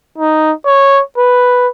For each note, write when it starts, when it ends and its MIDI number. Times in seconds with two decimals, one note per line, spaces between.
0.18 0.52 63
0.66 1.02 73
1.18 1.68 71